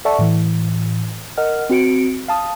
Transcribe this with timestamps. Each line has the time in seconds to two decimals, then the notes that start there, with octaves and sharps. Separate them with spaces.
0.05 A4 D5 E5 F#5 A5 C#6
0.19 A2 E3
1.37 A#4 D#5 F#5 F6
1.70 C4 F#4 C#7 D7
2.28 F5 A5 D#6